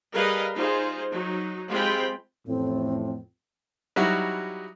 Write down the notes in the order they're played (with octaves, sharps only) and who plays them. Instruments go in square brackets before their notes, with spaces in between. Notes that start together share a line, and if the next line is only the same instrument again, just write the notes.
[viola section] G3 G#4 A#4 B4 D#5 F5
D#4 F4 G#4 C5
F#3 D#4
G#3 C4 F4 G4 G5 B5
[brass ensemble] A1 F2 A2 [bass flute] C4
[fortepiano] F#3 G3 D#4 E4 F#4